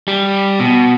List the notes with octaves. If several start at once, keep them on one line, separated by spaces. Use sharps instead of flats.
G3
B2